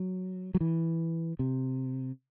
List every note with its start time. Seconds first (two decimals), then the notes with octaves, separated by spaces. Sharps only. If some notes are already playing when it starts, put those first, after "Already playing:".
Already playing: F#3
0.55 F#3
0.61 E3
1.39 C3